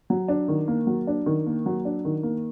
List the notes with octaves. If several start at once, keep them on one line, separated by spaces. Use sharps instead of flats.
F#3
D4
D#3
A#3
F#3
D4
D#3
A#3
F#3
D4
D#3
A#3